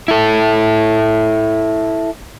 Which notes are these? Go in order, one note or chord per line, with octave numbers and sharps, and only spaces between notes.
E4 A4